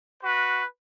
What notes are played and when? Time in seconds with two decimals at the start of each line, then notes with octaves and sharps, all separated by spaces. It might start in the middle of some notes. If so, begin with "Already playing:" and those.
0.22 F#4 B4